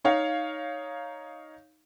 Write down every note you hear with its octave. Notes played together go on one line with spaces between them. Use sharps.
D#4 C#5 F5